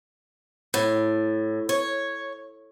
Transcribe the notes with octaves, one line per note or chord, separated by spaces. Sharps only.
A2
C#5